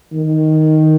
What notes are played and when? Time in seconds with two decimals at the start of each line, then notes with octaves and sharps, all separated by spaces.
0.13 D#3